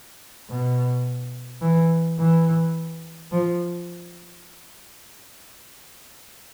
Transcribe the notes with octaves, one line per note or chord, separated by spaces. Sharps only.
B2
E3
E3
F3